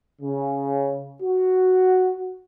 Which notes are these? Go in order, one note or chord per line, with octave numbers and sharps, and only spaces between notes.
C#3
F#4